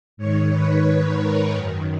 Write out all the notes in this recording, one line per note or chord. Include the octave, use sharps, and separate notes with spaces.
G#2 D#3 C#5
B4
A#4
F#2 D#3